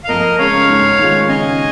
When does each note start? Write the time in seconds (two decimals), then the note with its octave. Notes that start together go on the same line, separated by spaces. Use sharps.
0.04 F5
0.09 F2 A#4 D#5
0.39 C#3 G#3 C#4 C#5 F5
0.69 G#2
0.99 D#3 G#3 F4
1.28 C#3 D#5 G#5